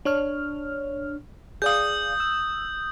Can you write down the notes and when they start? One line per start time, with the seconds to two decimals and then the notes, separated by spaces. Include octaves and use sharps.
0.05 D4 C#5 F6
1.62 G#4 D5 F5 D#6 G6
2.20 E6